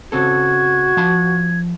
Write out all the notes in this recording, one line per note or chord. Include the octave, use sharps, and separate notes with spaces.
C#3 C4 F#4 A4 G#6
F3 A5 B5